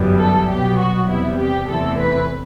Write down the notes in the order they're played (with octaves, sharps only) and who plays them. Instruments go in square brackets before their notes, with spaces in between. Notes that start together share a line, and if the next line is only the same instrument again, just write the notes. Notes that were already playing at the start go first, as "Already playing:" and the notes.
Already playing: [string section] G1 F#2 E3 G3 B3
A4
C2 B2 F#3 B3 G4
F#4
E2 C3 G3 B3 E4
G4
E2 C3 E3 A3 C4 A4
B4